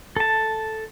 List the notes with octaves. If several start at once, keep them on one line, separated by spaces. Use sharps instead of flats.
A4 A5